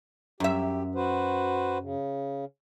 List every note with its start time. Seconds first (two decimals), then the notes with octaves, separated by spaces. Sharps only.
0.40 F#2 G4 E5
0.95 F#4 B4 C5
1.81 C#3